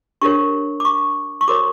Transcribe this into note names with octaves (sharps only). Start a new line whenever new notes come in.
D4 G4 A#4 C#5 C#6
D6
C#6
C#6
F#4 A#4 C#5 D6